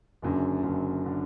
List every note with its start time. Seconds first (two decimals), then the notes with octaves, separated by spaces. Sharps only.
0.22 F#1 F#2 D3
0.63 F#1 F#2 D3
1.06 D3